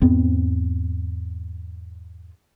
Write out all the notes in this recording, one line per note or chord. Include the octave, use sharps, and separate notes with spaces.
E2 G#2 B3 C4